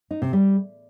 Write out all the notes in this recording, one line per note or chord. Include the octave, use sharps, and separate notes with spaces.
D#4
C3
G3